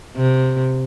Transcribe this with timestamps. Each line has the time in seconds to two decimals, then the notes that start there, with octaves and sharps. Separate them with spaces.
0.17 C3